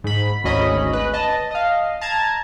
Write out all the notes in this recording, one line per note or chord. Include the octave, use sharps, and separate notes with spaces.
G#2 B5
G#1 D2 G#2 C#4 D#5 B5
B4
D#5 A5
D#5 F5
A5 A#5 G#6